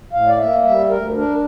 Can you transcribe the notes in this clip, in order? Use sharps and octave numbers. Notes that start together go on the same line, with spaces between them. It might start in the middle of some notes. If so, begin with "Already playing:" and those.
A2 F5
D5
A#3 E5
G3 E5
D2 A#4
D4 A#4